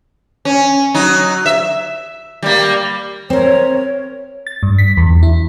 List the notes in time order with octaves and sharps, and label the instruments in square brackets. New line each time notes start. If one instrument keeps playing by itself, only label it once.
[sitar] C#4
F#3 D#4
E5
G3 A#3
[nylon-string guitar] C4 A#4 [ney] C#5
[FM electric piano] A6
G2
B6
E2
E4